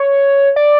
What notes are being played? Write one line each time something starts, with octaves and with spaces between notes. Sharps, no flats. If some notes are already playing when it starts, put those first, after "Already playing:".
Already playing: C#5
D5